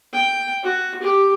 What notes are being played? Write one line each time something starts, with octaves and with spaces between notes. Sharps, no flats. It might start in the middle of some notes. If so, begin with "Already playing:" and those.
G5
F#4
G4